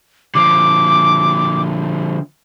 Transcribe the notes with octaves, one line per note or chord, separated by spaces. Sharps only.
D3 F3 D6